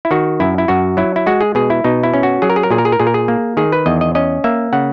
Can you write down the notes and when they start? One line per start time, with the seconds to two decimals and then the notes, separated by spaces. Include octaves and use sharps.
0.05 E4
0.11 D#3 F#4
0.40 F#2 E4
0.58 E4
0.68 F#2 F#4
0.97 F#3 E4
1.16 E4
1.26 G#3 F#4
1.41 G#4
1.55 B2 G#4
1.70 E4
1.84 B2 D#4
2.03 E4
2.14 C#4
2.23 F#4
2.42 F#3 G#4
2.50 A#4
2.56 G#4
2.63 A#4
2.70 A#2 G#4
2.78 A#4
2.85 G#4
2.92 A#4
3.00 A#2 G#4
3.07 A#4
3.14 G#4
3.28 A#3
3.57 D#3 G#4
3.72 B4
3.86 E2 D#5
4.01 D#5
4.15 C#4 D#5
4.44 A#3 E5
4.73 C#3 F#5